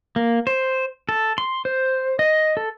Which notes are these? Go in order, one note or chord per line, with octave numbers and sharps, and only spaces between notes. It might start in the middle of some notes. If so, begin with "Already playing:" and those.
A#3
C5
A4
C6
C5
D#5
A4